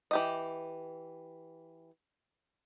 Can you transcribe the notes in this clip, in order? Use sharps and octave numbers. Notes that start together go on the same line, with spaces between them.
E3 G4 D#5